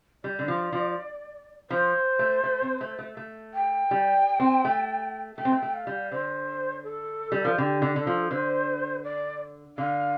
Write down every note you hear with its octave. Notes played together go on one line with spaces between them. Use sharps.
G3 D5
D3
F3
F3
F3 C5
A3
A3
C4
A3
A3
A3
G5
G3
C4
A3
A3 G5
C4
A3
A3
F5
G3
D3 C5
A4
G3
F3
D3 G4
D3
D3 A4
F3
D3 C5
D5
D3 F5